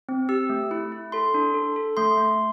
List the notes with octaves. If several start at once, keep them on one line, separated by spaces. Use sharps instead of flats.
C4
G4 E6
A3
E4
E4
A4 C6
D4
A4
A4
A3 C6
A3